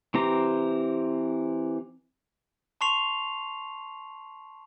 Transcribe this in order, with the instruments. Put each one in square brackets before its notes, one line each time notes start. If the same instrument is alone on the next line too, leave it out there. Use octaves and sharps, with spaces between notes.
[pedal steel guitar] E3 C4 G4 A#5
[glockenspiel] A5 C6 C#6 C7 F7